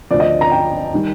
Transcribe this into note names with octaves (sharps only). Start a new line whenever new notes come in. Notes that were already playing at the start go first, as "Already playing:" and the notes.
D2 D3 F3 D5
D#5
A#5
G5
D#3 G3